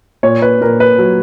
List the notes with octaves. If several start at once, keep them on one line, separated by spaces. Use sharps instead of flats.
A#2 C#5
B4
A#2 A#4
B4
F#3